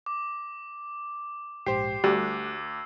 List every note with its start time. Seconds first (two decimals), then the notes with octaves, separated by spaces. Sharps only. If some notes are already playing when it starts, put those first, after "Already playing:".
0.06 D6
1.66 A#1 G#2 G4 C5 C7
2.04 D2 G3 A3 F#4 E6 F#6